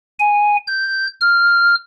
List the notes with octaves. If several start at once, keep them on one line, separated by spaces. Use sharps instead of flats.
G#5
G6
F6